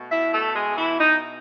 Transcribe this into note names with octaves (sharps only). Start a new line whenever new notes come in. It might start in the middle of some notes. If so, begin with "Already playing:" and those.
Already playing: B2 A3
E4 E5
A3 A4
G#3 G#4
E3 E4
D#4